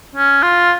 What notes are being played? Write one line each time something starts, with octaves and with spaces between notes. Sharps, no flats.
C#4
F4